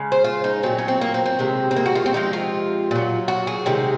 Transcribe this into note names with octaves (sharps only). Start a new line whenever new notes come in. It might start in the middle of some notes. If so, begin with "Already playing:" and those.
Already playing: C#3 G#3
C5
F4
D#4
A#2 F#3 C4
C#4
C4
A#3
C4
C4
C3 D#3 G#3
C4
A#3
F#4
F4
C4
C3 F3 G#3 D#4
F4
A#2 F#3
F#4
G#4
C3 D#3 G#3